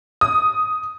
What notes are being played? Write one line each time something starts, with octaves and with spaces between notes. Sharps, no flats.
D#6